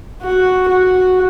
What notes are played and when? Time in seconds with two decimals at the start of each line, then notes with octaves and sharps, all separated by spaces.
0.22 F#4
0.68 F#4